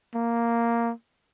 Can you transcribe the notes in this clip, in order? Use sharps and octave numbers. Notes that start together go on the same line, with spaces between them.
A#3